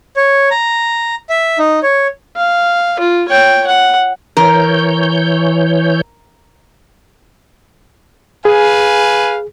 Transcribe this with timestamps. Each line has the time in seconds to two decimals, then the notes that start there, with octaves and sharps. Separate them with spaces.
0.16 C#5
0.51 A#5
1.29 E5
1.58 D#4
1.83 C#5
2.36 F5
2.99 F4
3.28 C#5 G5
3.67 F#5
4.37 E3 A#4 C#5 G6
8.45 G#4 B4 F5 G#5